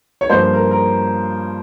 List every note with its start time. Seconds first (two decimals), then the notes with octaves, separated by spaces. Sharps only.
0.21 C#5
0.30 G2 F3 A#3 C5
0.53 A#4
0.71 A#4